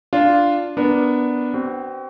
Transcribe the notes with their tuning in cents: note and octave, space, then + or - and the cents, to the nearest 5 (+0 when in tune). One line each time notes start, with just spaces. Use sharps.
D4 +0 F4 -5
B3 +0 D4 +0 A#4 +10
C4 +0 F#4 +35